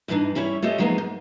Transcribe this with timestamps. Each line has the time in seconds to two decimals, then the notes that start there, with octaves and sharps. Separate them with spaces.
0.08 E2 G2 E3 D4 D#4
0.35 G3 C#4 E4 C#5 E5
0.62 A3 F4 G4 C#5 D#5 E5
0.78 F3 F#3 G#3 A#3 B3 D#4
0.98 G#2